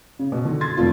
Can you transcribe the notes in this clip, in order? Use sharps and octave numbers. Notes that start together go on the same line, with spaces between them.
C#3
B2
D3 D#3
C6 G#6 A6
F1 A3 C4 F4